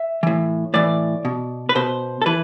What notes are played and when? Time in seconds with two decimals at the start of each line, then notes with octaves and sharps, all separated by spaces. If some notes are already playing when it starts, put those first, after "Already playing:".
Already playing: E5
0.23 A2 E3
0.74 A2 E3 D5
1.25 B2
1.69 B4
1.75 B2 C5
2.22 A4
2.26 E3 B4